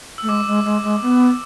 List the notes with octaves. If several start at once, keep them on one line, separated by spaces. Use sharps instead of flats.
A3 E6
G#3 D6
G#3
G#3
G#3
B3